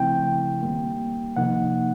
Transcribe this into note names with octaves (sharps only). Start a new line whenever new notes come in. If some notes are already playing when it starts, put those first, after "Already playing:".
Already playing: C#3 F3 A3 C4 E4 G5
D#3 G3 A#3
C3 F3 A#3 D#4 F#5